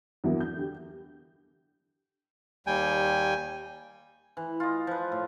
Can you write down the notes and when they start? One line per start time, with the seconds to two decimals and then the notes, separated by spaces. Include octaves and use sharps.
0.24 E2 G2 F#3 A#3 E4 F#4
0.40 G6
0.56 D3 G4
2.67 D#2 G3 G5 G#5
4.37 E3
4.60 F4 D#5
4.87 F3 B4
5.12 A2